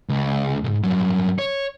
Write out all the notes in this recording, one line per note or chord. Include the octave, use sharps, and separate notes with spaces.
C#2
C2 G#2
G2 F#3
C#5